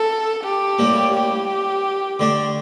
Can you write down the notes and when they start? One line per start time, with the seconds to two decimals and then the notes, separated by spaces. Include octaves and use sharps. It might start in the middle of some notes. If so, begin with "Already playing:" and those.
Already playing: A4
0.43 G4
0.79 A2 G3 A#3
1.14 G4
2.20 D3 A3 D4